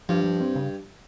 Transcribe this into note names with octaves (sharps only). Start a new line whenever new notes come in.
G2 F3
F3
C4
C#3